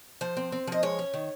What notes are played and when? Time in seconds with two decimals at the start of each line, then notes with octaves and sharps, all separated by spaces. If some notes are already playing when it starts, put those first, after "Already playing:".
0.21 F3 C5
0.37 C4
0.52 C4
0.67 F3 D#5
0.83 G#3 C#5
0.99 C#4
1.14 D#3